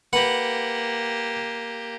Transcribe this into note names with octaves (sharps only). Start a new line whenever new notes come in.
A#3 G4 B4 F#5